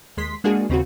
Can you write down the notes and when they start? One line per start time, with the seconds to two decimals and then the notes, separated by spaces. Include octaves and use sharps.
0.17 D#2 G#3 C6 B6
0.44 G#3 A#3 D4 F#4 G#4
0.69 D#2 C#3 C4 F4 F#4